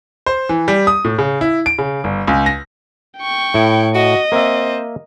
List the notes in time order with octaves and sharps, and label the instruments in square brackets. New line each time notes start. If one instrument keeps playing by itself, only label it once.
[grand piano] C5
E3
G3
D#6
A2
C#3
E4
D7
C#3
G1
C#2
A#6
[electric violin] G5 C#6
[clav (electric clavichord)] A2 [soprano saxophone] E4
[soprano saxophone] F#4 [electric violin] D#5
[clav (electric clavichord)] A#3 E5 [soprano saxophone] C4